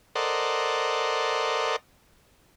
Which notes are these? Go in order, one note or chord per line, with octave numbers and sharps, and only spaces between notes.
A4 A#4 C5 D5 D#5 F#5